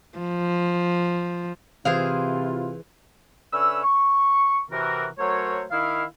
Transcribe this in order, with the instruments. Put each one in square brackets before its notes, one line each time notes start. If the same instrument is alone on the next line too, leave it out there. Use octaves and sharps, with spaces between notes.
[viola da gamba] F3
[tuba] C3 [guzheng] E3 G#4 C5 [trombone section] E4 F4 [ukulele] F5
[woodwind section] D3 C#4 B4 E5 E6
C#6
C3 E3 F#4 A#4
F#3 A3 F#4 A#4 C5 C#5
D#3 E4 F5